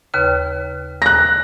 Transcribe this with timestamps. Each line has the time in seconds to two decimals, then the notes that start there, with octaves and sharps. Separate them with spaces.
0.14 D#2 C#3 B4
1.02 F#6 A#6